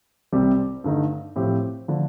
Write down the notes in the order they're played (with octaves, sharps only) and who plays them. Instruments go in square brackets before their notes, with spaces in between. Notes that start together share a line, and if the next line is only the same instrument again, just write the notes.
[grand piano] C2 C3 G3 C4 G4
G2 D3 A3 D#4
A2 F3 C4 G4
D3 F3 A3 D4